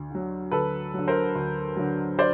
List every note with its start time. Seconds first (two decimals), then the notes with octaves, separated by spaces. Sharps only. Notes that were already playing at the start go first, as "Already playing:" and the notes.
Already playing: D2
0.10 D3 F#3
0.51 D2 A4 B4
0.94 D3 F#3
1.08 A#4 C5
1.35 D2
1.76 D3 F#3
2.19 C5 D5